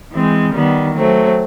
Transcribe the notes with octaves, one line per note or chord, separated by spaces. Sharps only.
E3 G#3 C4
D#3 G3 B3
F#3 A3 C4